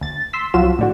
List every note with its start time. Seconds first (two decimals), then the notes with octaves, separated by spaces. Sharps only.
0.01 D2 A6
0.33 C6 E6 B6
0.54 C2 F3 F#3 F4 F#4 E7
0.79 A2 D3 F#4